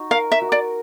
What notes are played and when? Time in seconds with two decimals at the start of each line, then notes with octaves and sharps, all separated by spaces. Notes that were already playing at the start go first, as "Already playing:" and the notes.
Already playing: D#4 F#4
0.11 A#4 F5
0.32 E5
0.41 F#4
0.52 D5